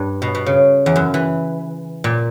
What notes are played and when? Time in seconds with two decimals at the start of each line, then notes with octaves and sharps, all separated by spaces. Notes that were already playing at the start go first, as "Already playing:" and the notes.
Already playing: G2
0.22 B2
0.35 B2
0.46 C#3
0.86 E2
0.96 F#2
1.14 E3
2.04 A#2